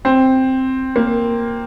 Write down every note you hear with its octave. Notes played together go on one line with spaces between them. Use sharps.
C4
A#3